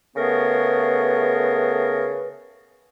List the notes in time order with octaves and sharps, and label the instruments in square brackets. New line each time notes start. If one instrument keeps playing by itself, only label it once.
[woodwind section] C#3 A3 B3 G#4 A#4 B4